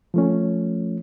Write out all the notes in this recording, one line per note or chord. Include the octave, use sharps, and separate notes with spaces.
F3 A3 C#4